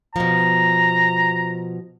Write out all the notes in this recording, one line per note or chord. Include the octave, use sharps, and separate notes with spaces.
B2 F3 A#5